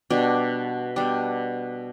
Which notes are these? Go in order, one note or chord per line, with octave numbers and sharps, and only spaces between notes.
B2 G3 D4
B2 G3 D4